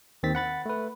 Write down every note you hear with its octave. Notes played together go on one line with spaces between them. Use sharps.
D#2 D#3 C4 A6 B6
F#5 B5 A6
A3 B4